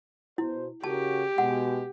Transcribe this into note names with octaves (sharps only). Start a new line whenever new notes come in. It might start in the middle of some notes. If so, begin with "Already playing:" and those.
B2 E4 C5
C#3 F#4 G4 A#4 A5
B2 G#3 F#5